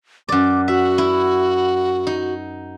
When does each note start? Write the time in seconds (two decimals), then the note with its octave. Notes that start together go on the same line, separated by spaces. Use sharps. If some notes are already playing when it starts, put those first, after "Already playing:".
0.29 F#2 D5 D6
0.68 F#4 E5
0.98 E4
2.07 D#4